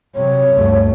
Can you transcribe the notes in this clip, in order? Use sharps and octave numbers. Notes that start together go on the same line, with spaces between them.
C3 F#3 C#5
D2 G2 A3